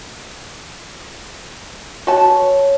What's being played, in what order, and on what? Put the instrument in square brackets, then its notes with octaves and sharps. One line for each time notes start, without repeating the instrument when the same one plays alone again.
[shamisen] F#4 B4 A5 [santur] C#5